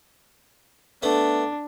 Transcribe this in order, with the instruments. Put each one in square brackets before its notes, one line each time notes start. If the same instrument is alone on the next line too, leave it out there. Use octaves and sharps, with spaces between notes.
[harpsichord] A3 B3 [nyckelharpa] D4